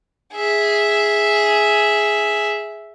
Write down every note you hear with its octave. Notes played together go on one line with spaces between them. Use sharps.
G#4 E5